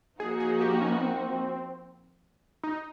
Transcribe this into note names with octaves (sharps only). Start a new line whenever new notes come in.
F3 A#3 D#4 F#4 G#4
G#4
G4
C#4
B3
C4
D#4